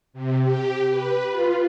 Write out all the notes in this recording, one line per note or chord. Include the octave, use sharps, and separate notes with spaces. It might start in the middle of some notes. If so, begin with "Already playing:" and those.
C3
G4
B4
F4